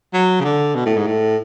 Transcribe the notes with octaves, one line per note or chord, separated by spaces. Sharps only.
F#3
C#3
D3
B2
A2
G#2
A2